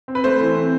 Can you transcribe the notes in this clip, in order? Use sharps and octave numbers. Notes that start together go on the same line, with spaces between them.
C4
B4
A3 C5
E3
C4